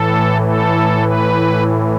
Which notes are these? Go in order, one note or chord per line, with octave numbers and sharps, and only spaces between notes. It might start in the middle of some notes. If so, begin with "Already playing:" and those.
Already playing: A2 E3 A4
A4
B4